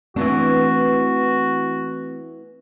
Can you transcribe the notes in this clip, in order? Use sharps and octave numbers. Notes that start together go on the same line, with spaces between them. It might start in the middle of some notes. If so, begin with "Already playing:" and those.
E3 A3 B3 C4 D4 F#4